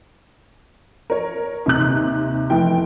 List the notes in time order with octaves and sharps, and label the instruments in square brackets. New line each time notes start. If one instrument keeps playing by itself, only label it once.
[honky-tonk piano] A#4 C#5
D#2 C3 F#6
F1 E3 G5